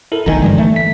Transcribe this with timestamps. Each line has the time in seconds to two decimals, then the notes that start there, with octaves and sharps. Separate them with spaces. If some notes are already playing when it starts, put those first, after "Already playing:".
0.12 E4 A4 A#4
0.26 F1 B1 D#3 G#5 A#5
0.42 G2 D3 E3 F3 G3 G#3
0.58 A3
0.76 B6